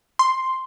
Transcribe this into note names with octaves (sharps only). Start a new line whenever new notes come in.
C6